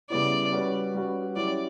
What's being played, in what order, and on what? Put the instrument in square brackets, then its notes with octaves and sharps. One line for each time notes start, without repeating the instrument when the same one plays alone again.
[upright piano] C#3 G3 B3 E4 [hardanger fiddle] D5
[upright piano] G3 C#4 F#4 B4
G3 C#4 F#4 B4
[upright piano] F#3 C#4 E4 G4 [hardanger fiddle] D5